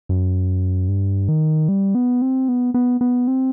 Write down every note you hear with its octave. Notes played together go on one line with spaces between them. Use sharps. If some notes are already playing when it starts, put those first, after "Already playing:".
F#2
G2
D#3
G3
B3
C4
B3
B3
B3
C4